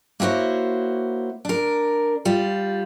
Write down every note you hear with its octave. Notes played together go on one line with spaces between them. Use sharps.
A#3 E4 F#4 C5 C#5
D4 A#4
G3 F4